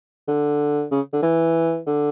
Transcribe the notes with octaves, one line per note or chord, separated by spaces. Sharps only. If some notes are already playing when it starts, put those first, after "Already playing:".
D3
C#3
D3
E3
D3